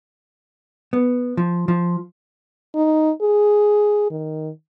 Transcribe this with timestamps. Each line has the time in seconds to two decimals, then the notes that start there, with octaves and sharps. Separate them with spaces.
0.93 B3
1.37 F3
1.68 F3
2.75 D#4
3.22 G#4
4.11 D#3